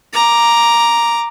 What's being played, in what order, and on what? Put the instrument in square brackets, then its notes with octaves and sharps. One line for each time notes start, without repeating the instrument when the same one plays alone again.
[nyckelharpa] A#5 D6